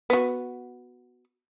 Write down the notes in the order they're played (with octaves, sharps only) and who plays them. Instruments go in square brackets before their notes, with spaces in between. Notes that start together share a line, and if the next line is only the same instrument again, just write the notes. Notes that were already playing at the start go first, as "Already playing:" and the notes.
[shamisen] B3 F#4